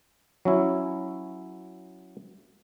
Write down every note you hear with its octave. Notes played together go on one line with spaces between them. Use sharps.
F#3 C#4 E4